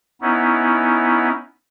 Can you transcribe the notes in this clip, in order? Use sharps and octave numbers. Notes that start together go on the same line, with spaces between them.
B3 C#4 D#4 E4